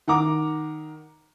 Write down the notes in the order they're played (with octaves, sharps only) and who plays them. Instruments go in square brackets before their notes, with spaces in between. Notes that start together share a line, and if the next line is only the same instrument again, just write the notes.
[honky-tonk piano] D#3 F#5 A#5 D6